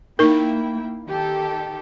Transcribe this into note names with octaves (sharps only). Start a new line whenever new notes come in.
A#3 D#4 E4 A#4 G5
D#3 G4 A4